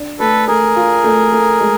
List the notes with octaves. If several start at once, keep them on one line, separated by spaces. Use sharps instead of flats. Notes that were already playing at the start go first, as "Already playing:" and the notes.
Already playing: D4
A3 A4 B4
A3 G#4 A#4
F4
A3
A3
G#3